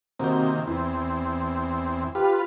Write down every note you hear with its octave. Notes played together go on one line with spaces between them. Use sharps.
C3 D#3 A#3 C4 F#4 G6
E2 E3 C4
F4 G4 B4